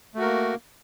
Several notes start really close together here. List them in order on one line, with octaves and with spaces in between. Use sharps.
A3 F#4 A#4 A#3